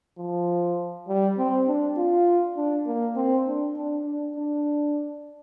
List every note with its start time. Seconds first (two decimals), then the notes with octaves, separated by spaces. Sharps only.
0.18 F3
1.08 G3
1.38 C4
1.67 D4
1.97 F4
2.57 D4
2.87 A#3
3.16 C4
3.46 D4
3.76 D4
4.06 D4
4.35 D4